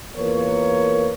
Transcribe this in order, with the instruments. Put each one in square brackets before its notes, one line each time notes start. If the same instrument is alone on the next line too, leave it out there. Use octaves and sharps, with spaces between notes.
[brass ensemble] E2 A#3 F4 A#4 B4 C#5